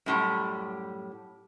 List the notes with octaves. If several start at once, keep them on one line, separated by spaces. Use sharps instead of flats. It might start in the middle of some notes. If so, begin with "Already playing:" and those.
F#2 A2 G3